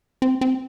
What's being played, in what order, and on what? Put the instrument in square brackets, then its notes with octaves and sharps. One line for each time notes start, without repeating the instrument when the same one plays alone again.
[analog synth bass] C4
C4